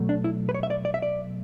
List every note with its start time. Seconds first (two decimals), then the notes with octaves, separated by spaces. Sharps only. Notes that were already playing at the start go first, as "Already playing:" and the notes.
Already playing: B2 F#3 A3
0.09 D4
0.24 E4
0.49 B4
0.55 C#5
0.63 E5
0.70 D5
0.85 D5
0.94 E5
1.02 D5